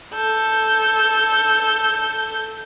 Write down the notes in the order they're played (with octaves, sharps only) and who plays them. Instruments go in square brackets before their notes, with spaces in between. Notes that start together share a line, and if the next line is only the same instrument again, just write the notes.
[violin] A4 G6